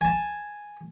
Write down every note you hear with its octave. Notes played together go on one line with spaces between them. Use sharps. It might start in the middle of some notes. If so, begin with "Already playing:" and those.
G#5 A5